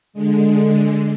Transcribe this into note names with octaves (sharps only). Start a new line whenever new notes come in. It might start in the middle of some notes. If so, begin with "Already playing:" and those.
D3 G#3